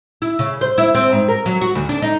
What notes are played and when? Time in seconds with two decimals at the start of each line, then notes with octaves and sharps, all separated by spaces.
0.22 E4
0.39 C#3
0.61 C5
0.78 E4
0.95 C4
1.12 G#2
1.28 A#4
1.46 F#3
1.61 F#4
1.75 D2
1.89 D4
2.02 D#4